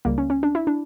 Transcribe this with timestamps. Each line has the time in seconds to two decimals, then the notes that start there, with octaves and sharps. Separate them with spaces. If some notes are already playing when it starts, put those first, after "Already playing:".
0.05 C#2 C#3 G3 A#3
0.18 C#4
0.30 C#4
0.43 D4
0.55 E4
0.67 D4